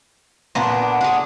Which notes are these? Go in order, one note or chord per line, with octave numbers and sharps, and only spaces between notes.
A#2 B3 D4
F#5
D4 G#4